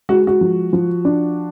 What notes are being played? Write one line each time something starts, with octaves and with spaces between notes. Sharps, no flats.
G#3 F#4
F#4
F3
F3
D4